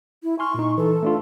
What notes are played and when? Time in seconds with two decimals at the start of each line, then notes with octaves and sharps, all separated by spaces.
0.24 E4
0.39 G#5 C6 C#6 F6
0.54 A#2 D#4
0.78 E3 A4
1.03 A3 D4 F4